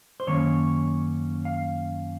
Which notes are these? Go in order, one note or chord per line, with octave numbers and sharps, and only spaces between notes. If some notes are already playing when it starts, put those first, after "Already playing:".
C5
F#2 D#3 A#3 C#4 C#5
F5